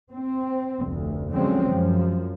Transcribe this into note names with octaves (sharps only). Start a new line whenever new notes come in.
C4
F1 D2
D3 F3 F#3 G#3 C4 C#4
F#2 F3